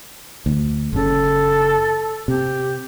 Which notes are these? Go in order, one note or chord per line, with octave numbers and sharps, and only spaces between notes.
D2
F#1 C#3 A4
C3 G4